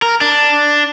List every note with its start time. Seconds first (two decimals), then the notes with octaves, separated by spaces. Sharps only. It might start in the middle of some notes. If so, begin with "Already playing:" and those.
0.02 A#4
0.21 D4